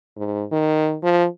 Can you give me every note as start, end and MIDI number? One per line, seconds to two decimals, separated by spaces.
0.17 0.45 44
0.52 0.96 51
1.03 1.27 53